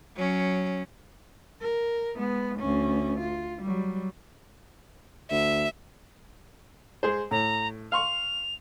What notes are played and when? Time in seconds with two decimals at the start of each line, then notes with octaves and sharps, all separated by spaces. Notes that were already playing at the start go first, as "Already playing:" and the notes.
0.15 F#3 C#4
1.61 A#4
2.16 G#3 B3
2.59 D2 C#4
3.19 F4
3.62 F#3 G3
5.31 D2 E5
7.03 G#3 G#4 C5
7.31 A2 A#5
7.92 F5 C6 C#6 F7